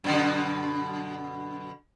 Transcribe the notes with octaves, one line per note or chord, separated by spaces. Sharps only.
F#2 B2 D3